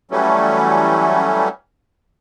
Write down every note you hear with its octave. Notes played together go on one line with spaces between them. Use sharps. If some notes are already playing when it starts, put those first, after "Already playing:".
E3 F#3 G3 A3 C#4